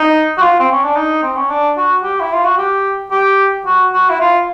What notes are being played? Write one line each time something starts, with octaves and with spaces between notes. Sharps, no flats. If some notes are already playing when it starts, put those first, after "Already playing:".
Already playing: D#4
F#4
F4
C4
C#4
D4
D#4
C4
C#4
D4
F#4
G4
E4
F4
F#4
G4
G4
F#4
F#4
E4
F4